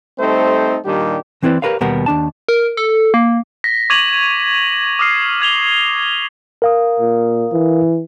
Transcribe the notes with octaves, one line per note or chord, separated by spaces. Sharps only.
G3 A3 C4 D#4 A4 C5
A#2 D#3 G3 D4 G4
E3 C4 E4 B4 D5
G4 A#4 B4 C#5 F5
D#2 B2 G3 B3 A#4 F#5
D#2 D4 A5
A#4
A4
A#3
A#6 B6
C#6 D6 G#6 D#7 F7 F#7
D6 D#6 F6 C7
F6 G#6 F7 G7
A#4 F5 D#6
A#2
E3